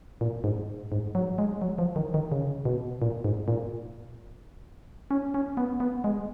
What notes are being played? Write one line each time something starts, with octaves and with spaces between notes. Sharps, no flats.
A#2
G#2
G#2
F#3
G#3
F#3
F3
D#3
D#3
C#3
B2
A#2
G#2
A#2
C#4
C#4
B3
B3
G#3